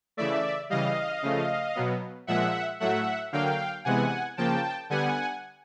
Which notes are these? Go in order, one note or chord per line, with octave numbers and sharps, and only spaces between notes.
C#3 E3 A3 D5 E5
C#3 E3 G3 D#5 F5
C#3 F3 A3
B2 F#3 B3
A#2 F3 G#3 E5 F#5
A2 F#3 A3 E5 F#5
D3 F#3 A#3 F5 G5
C3 E3 G#3 B3 F#5 G#5
C#3 F3 A#3 G5 A5
D3 G3 B3 F#5 G#5